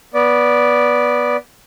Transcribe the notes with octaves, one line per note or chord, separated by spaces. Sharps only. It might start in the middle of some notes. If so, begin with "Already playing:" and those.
B3 D5